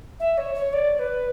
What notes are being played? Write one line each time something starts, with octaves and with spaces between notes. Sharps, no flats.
E5
C#5
C#5
D5
B4